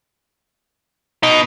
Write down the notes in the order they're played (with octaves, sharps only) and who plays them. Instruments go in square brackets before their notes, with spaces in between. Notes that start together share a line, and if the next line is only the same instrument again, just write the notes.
[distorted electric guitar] B2 [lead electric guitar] D#4